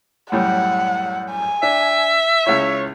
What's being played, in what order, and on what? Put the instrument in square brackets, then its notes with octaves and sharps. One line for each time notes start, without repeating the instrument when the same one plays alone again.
[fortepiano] F#2 A2 G3 [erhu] F#5
[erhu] G#5
[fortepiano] D4 [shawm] E5
[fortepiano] C#2 E4 [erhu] C#5